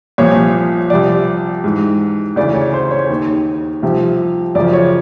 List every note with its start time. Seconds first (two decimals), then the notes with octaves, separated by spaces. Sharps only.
0.18 C2 A#2 F3 C#5
0.90 C2 C3 F3 D5
1.64 G#2 E3
2.36 D2 C#3 E3 D5
2.54 C#5
2.73 C5
2.91 C#5
3.09 D#2 D#3
3.83 C2 C3 F3
4.55 F#2 C#3 F3 D5
4.73 C#5